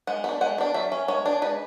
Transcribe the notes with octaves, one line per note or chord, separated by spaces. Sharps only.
G#3 F#5
B3 D4
G#3 F#5
B3 D4
F#3 E5
C#4
G#3 C#5
D4
G#3 B4